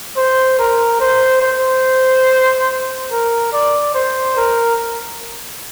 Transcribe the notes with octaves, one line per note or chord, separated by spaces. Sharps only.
C5
A#4
C5
C5
A#4
D5
C5
A#4